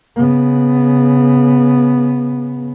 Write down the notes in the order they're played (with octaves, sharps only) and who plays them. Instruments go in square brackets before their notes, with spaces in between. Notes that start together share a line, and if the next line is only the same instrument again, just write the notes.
[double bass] C#3 B3